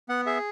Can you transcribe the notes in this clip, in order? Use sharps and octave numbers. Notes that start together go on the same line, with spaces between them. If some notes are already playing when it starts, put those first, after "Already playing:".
B3 F#5
G#4 E5